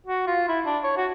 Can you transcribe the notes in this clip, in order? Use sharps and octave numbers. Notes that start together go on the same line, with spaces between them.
F#4
F4
E4
D4
C#5
F#4